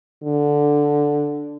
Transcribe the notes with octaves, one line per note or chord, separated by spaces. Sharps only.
D3